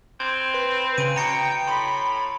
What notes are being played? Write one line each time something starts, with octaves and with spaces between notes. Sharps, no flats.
C4 G#6
B4
C#3 D7 D#7
B2 G5 A#5 C#7 D7
A2 B5 C6